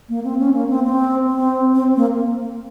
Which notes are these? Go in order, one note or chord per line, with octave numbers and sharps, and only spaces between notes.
A#3
C4
C#4
A#3
C4
C4
C4
C4
A#3